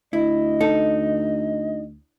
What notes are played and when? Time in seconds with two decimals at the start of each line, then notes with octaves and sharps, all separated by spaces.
0.13 D2 E4 D#5
0.61 D#4 A4